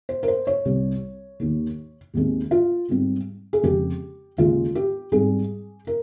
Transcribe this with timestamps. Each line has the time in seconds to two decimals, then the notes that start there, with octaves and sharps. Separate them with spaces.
0.09 C5
0.23 A#4
0.28 C5
0.47 C#5
0.65 C2 C3 G3 C4
1.40 D#2 D#3 A#3
2.14 D#2 D#3 G#3 C4
2.51 F4
2.89 G#2 G3 C4
3.53 G#4
3.63 F2 C#3 G#3 C4 G4
4.38 D#2 C#3 G#3 F4
4.75 G4
5.12 G#2 G3 C4 G#4
5.87 A#4